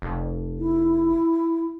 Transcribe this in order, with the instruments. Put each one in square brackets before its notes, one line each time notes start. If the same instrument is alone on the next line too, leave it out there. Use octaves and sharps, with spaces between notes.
[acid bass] F1
[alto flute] E4